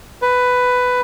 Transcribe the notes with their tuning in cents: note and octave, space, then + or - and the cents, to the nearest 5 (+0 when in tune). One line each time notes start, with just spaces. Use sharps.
B4 +10